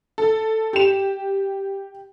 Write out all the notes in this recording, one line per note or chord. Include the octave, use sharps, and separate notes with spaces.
A4
G4 E7